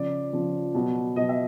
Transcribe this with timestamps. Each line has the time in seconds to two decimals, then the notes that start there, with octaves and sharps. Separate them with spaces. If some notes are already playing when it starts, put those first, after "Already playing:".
Already playing: C#3 F3 D5
0.33 C#3 F3
0.74 B2 F#3
1.16 B2 F#3 D#5
1.29 E5